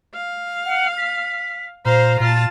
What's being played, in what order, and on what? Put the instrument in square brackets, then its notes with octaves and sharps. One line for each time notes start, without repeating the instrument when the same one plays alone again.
[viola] F5
[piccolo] F#5
B6
[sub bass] A#2 [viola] C5 F5 [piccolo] A#5
[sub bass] A#2 [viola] F4 A5